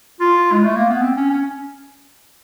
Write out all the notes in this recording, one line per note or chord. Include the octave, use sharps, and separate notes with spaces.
F4
G#3
A3
A#3
B3
C4
C#4
C#4